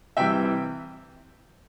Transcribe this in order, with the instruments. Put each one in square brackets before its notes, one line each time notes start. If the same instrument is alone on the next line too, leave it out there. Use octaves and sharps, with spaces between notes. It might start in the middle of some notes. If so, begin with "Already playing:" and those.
[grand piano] C3 E3 G3 E5 G5